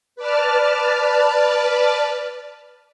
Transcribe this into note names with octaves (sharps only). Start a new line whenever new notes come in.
B4 D5 A5 F6